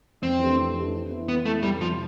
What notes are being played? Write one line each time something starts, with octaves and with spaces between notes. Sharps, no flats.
F2 C4
E3 A3 D4 G4
F2
E3 A3 D4 G4
E3
B3 E4
E3 B3
A3 B3 E4
F2 G3
C3 E3 F3